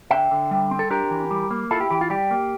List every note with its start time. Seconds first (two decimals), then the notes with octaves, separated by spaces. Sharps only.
0.11 D3 E5 G5
0.31 D3
0.51 G3
0.71 C4
0.79 A4
0.90 D4 G4 A#4
1.11 E3
1.31 G3
1.51 A#3
1.71 E4 F4 A4
1.80 G4
1.91 E3 G4
2.01 F4
2.10 G3 G4
2.31 A#3